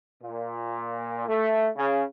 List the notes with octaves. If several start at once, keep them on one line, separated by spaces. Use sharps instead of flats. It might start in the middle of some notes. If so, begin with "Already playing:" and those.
A#2
A3
C#3